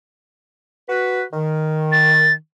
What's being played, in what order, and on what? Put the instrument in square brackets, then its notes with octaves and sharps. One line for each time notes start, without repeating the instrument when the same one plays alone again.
[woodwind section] F#4 B4
D#3
[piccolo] A6